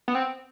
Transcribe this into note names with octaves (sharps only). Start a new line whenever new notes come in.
B3
C4